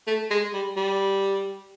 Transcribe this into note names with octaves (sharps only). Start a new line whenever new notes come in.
A3
G#3
G3
G3